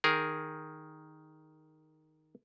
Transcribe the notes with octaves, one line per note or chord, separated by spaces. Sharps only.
D#3 G#4 A#4